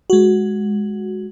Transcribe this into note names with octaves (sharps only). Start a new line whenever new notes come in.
G#3 F#4